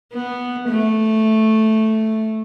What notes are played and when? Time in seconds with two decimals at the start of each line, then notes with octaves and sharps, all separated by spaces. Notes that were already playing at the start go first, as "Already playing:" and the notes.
0.14 B3
0.68 A3